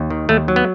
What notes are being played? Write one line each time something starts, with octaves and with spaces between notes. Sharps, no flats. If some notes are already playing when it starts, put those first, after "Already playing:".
Already playing: D#2
D#3
D#2 A3
F#3
B3